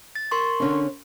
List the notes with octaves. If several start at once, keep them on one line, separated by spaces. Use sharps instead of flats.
A6
A#4 C6 C#6
D3 C#4 D4